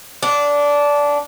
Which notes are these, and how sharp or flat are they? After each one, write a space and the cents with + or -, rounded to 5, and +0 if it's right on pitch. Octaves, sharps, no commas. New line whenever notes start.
D4 -15 F#5 +0